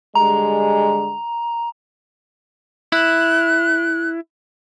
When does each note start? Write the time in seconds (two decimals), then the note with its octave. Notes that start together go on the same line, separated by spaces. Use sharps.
0.15 D3 G3 G#3 A#5
2.92 E4 F#6